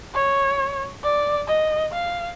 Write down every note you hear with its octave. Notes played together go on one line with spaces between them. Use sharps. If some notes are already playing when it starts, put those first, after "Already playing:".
C#5
D5
D#5
F5